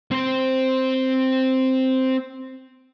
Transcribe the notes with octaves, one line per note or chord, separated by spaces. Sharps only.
C4 C5